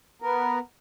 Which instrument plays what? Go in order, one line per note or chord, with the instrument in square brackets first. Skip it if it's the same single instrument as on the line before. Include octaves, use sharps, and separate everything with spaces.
[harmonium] B3 A#4